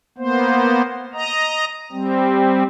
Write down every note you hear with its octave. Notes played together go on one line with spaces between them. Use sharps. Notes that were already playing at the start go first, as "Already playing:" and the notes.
A#3 B3 C5
D#5 A#5
G3 C4